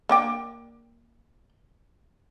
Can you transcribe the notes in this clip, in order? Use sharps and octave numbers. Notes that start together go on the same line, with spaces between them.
A#3 D4 G5